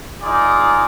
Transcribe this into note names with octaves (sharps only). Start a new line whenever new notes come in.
D#4 F4 G#4 D5